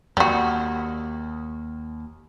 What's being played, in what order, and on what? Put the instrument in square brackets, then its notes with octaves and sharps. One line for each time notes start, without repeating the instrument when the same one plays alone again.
[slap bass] D#2 [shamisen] G3 F#4